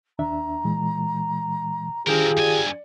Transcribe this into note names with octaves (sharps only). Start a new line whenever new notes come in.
D#2 D4 E5 A#5
A#2 E3 G#3
D#3 C4 D4 F4 G4 G#4 A#4
G2 D5 G#5